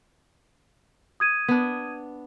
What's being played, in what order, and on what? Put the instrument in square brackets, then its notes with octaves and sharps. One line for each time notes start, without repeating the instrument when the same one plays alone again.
[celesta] D#6 G#6 D#7
[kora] B3 D4